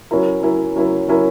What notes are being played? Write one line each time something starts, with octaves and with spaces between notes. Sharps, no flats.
F#3 C#4 E4 A#4
F#3 C#4 E4 A#4
F#3 C#4 E4 A#4
F#3 C#4 E4 A#4